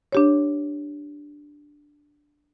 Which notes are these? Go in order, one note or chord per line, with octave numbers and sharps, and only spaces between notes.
D4 G4 C#5